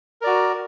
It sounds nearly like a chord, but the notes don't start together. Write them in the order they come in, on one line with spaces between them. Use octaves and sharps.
A#4 D5 F#4